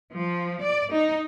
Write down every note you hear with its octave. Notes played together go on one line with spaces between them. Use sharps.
F3
D5
D#4